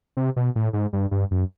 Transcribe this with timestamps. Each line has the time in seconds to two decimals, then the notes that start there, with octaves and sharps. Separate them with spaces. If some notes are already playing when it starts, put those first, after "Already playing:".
0.17 C3
0.36 B2
0.56 A2
0.73 G#2
0.93 G2
1.11 G2
1.31 F#2